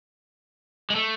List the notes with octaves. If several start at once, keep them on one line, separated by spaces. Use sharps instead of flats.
G#3
A3